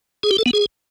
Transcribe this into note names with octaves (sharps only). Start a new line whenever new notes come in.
G#4
G4
A4
B3
G#4